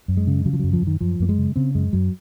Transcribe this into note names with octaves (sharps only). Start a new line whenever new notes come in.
F#2
G#3
C#3
C#3 F#3
F3
F#2 F#3
F3
F#2
D#3
F#2 F3
F#2 A#3
G#3
C#3
C#3 C4
F#2 G#3
F#2 F#3